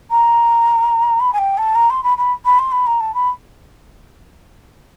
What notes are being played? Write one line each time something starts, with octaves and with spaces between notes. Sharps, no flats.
A#5
B5
G#5
G5
A5
A#5
C6
B5
B5
B5
C6
B5
A#5
A5
B5